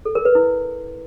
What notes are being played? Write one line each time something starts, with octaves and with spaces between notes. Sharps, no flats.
A4
A#4
B4
E4